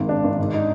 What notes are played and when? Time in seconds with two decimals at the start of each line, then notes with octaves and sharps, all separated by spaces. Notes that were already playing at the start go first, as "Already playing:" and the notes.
Already playing: G#1 G#2 A#3
0.09 D4
0.24 G#1
0.39 G#2
0.54 D#4